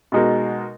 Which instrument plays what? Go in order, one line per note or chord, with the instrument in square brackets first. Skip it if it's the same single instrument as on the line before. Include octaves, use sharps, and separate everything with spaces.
[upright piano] B2 G#3 D#4 F#4 A#4